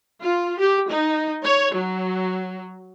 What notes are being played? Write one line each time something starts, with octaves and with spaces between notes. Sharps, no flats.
F4
G4
D#4
C#5
F#3